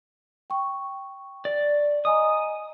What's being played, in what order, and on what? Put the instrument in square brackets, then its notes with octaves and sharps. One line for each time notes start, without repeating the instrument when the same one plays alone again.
[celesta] G5 C#6
[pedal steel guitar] D5
[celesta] D#5 G#5 A#5 [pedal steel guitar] D#6